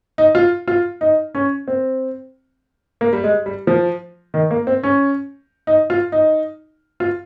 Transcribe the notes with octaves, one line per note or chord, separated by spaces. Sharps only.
D#4
F4
F4
D#4
C#4
C4
A#3
G3
G#3
G3
F3
D#3
A#3
C4
C#4
D#4
F4
D#4
F4